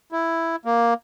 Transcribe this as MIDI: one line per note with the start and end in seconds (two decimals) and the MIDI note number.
0.12 0.56 64
0.65 0.94 58